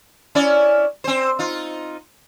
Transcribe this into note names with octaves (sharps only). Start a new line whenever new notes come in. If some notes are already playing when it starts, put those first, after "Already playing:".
C#4 E4 D5
C4 C5
D#4 F4